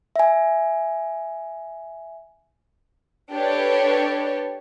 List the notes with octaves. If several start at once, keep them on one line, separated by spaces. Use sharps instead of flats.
E5 G#5
D4 G4 A4 B4 C#5